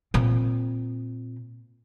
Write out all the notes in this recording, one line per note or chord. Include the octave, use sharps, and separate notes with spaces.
A#2 C4